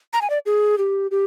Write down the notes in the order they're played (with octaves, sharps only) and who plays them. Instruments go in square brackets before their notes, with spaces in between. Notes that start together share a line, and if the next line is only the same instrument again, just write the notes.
[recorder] A#5
G#5
D5
G#4
G4
G4